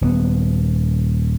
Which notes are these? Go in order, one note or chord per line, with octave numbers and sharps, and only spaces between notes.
D#1 B3